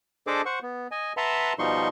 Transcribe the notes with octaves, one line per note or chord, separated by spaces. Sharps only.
D4 G#4 A4 C5 D#5 D6
C5 F#5 C#6
B3
D#5 G#5
B4 E5 F#5 A5 A#5 C6
B2 F3 G3 D#4 C6 C#6